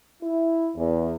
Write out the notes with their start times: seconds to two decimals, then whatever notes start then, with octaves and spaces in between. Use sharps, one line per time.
0.23 E4
0.76 E2